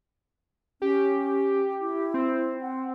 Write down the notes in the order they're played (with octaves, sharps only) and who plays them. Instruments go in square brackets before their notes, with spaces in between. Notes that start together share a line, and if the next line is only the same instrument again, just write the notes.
[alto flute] C#4 [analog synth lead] G4
[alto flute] E4
[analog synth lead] C4
[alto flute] F#5